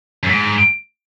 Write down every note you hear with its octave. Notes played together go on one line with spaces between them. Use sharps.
F#2
G#2